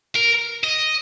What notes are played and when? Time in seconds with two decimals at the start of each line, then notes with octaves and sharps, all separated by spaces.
0.15 A#4
0.64 D#5